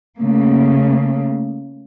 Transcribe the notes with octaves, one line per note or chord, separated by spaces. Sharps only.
C#3 A3 A#3